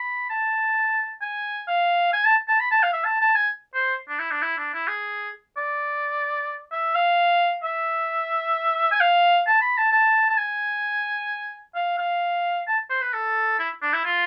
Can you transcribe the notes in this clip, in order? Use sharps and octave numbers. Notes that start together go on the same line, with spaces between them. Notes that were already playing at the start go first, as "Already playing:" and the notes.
Already playing: B5
A5
G#5
F5
G#5
A5
A5
B5
A5
F5
E5
A5
A5
G#5
C5
D4
E4
D4
E4
D4
E4
G#4
D5
E5
F5
E5
G#5
F5
A5
B5
A5
A5
A5
G#5
F5
F5
A5
C5
B4
A4
E4
D4
E4
F4